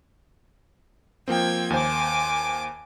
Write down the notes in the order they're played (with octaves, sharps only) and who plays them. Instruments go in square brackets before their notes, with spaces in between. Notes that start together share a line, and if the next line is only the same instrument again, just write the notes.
[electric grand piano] F3 A#3 C4 [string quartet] G5 G#6
[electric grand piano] D#2 C5 [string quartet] G#5 D6